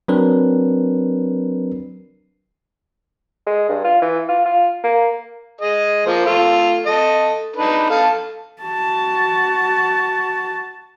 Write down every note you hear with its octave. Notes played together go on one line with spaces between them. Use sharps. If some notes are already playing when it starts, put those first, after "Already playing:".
F#3 C4 D4 A#4 B4
G#3
G2
F4
E3
F4
F4
A#3
G#4 D#5
F3 A#3 C5
A3 F4
A4 D#5
D4 D#4 B4
A4 F5 A5
F#4 A5